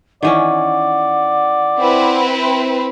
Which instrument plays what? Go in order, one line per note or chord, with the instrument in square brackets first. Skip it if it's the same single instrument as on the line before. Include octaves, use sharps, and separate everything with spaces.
[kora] D#3 E3 C#4 [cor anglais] D5 [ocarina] F#5
[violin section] C4 E4 B4